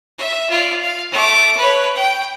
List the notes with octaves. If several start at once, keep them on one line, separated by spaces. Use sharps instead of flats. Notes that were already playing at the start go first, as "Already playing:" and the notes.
E5
F4 D5
F5
A3 D6
B4 C#5
G5